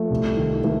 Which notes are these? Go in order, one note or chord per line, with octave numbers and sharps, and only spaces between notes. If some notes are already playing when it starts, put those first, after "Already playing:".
Already playing: F3 A3
C2
D#3
D#3 A3